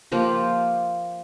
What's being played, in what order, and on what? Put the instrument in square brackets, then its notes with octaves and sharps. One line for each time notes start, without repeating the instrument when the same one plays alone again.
[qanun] F3 A#3 F4 G4